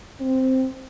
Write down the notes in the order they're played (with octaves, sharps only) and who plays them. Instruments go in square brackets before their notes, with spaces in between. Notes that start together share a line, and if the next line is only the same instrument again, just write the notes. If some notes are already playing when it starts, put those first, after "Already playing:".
[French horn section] C4